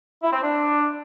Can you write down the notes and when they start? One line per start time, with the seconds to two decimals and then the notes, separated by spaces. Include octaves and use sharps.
0.23 E4
0.33 C4
0.43 D4